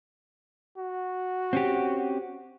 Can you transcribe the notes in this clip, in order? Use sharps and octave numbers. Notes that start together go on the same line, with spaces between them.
F#4
C4 C#4 G4